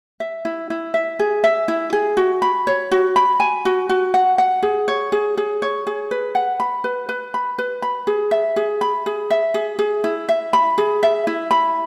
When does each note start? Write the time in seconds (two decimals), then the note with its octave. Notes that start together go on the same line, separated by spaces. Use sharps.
0.20 E5
0.45 E4
0.70 E4
0.94 E5
1.19 G#4
1.44 E5
1.68 E4
1.93 G#4
2.17 F#4
2.42 B5
2.67 C#5
2.91 F#4
3.16 B5
3.40 G#5
3.65 F#4
3.89 F#4
4.14 F#5
4.38 F#5
4.63 G#4
4.88 C#5
5.12 G#4
5.37 G#4
5.62 C#5
5.87 G#4
6.11 B4
6.35 F#5
6.60 B5
6.84 B4
7.09 B4
7.34 B5
7.58 B4
7.82 B5
8.07 G#4
8.31 E5
8.56 G#4
8.81 B5
9.06 G#4
9.30 E5
9.54 G#4
9.79 G#4
10.04 E4
10.29 E5
10.53 B5
10.78 G#4
11.03 E5
11.27 E4
11.51 B5